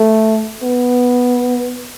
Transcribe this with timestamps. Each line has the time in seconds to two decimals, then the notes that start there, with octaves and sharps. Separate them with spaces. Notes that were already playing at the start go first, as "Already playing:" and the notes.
Already playing: A3
0.63 B3